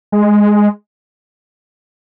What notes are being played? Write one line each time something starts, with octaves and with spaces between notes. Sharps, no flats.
G#3